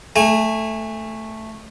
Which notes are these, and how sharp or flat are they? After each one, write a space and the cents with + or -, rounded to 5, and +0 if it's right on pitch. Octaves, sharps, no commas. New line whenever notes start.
A3 +0 G#5 -25